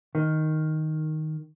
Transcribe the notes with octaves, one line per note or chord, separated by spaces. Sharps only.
D#3